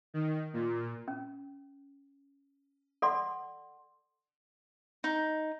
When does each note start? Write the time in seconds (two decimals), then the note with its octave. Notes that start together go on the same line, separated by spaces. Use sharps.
0.14 D#3
0.53 A#2
1.08 C#4
3.02 A4 D5 F#5 C6
5.04 D#4